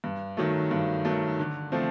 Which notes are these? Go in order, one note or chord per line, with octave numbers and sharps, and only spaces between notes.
G2
D#3 F#3 A3
G2
D#3 F#3 A3
D3
F3 A3 C4